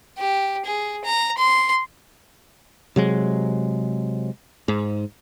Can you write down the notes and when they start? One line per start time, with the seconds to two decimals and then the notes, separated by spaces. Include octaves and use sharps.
0.18 G4
0.65 G#4
1.05 A#5
1.37 C6
2.96 C3 F#3 G#3
4.68 G#2